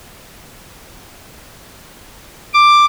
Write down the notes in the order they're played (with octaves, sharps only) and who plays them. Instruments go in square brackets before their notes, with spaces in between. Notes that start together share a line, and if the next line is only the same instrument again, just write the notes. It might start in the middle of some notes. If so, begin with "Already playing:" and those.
[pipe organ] D6